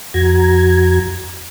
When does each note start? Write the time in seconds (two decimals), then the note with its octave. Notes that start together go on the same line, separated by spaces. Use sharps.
0.14 F2 F#4 A#5 G#6